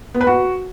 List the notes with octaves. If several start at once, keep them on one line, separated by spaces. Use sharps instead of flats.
B3
B4
F#4